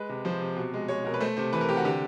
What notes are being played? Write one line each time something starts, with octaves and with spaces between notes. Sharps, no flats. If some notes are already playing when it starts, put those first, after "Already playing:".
Already playing: G#3 B4
C3
F3 C5
C3
B2
G#3
G#3 C#5
B2 A#4
B4
A3 C5
C3 C5
E3 B4
A#4
C3 G4
F#4
D3 G4